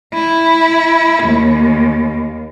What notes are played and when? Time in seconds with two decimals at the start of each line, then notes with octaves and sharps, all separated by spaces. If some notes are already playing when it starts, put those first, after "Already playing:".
0.13 E4
1.24 D#2